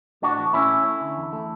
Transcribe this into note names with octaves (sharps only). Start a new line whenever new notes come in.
A2 D4 F#4
E3
A2 C#4 E4
A3
C#4
D3
E2
A3